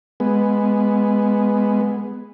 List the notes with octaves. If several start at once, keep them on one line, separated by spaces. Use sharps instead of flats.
G#3 B3